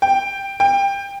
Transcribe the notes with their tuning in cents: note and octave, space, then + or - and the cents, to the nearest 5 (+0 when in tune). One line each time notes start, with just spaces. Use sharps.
G5 +0
G5 +15